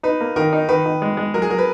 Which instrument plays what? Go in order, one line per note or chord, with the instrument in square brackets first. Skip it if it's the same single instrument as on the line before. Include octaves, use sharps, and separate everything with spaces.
[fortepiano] D#4 [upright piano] B4
[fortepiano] A#3
[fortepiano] D#3 [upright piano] A#4
[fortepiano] D#4
[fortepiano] D#3 [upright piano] B4
[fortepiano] D#3
G#3
G#3
[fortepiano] F#3 [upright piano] A#4
[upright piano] G#4
[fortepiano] F#3 [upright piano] A#4
[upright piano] B4